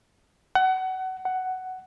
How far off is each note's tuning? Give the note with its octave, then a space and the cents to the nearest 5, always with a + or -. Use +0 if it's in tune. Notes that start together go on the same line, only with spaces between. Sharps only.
F#5 +25
F#5 +10